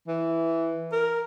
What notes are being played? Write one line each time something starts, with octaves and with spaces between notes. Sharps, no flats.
E3
A#4